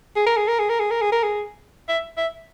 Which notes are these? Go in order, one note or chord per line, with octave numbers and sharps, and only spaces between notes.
G#4
A#4
G#4
A#4
G#4
A#4
G#4
A#4
G#4
A#4
G#4
E5
E5